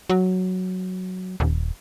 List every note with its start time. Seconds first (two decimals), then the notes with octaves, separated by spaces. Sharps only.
0.10 F#3
1.40 D#1